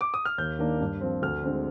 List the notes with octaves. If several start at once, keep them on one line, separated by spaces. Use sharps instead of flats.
D6
D#6
F6
D#2 G6
D#3 A#3 D4
G2
F3 C4
D2 F6
D3 G#3 C4